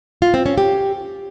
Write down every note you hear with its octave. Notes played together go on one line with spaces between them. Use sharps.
F4
C4
C#4
G4